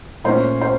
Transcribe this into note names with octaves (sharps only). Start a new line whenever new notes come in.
A#2 A3 C#4 C5
C5